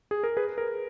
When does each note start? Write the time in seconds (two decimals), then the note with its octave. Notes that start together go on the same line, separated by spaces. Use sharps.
0.11 G#4
0.23 A#4
0.37 G#4 B4
0.58 A#4